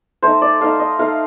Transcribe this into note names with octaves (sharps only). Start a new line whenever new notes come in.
A3 D#4 C5
D5
A3 D#4 F5
D#5
A3 D#4 F5